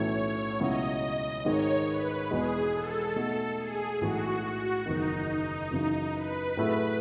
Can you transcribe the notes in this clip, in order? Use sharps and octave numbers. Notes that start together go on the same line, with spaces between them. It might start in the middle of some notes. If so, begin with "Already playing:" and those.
Already playing: B1 A2 E3 A3 C#4 C#5
C#2 B2 F#3 C#4 E4 D#5
G#1 G#2 D#3 G#3 C#5
B4
E1 E2 B2 G#3 G#4
A4
B2 A3 D#4 F#4
G#4
B1 A2 E3 G#3 F#4
F#4
F#1 E2 D#3 D#4
D#4
F#2 C#3 E3 D#4
B4
A2 F#3 A3 E4 G#4